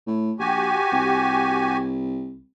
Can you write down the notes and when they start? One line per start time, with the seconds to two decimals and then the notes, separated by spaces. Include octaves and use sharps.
0.06 A2
0.39 A#1 F#4 G4 G#5
0.92 C2